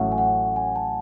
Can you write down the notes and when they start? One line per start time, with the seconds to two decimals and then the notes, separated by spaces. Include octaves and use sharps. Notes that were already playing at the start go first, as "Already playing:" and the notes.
Already playing: A1 A2 F#3 A3 C#4 F#5
0.12 G#5
0.18 F#5
0.56 G#5
0.76 A5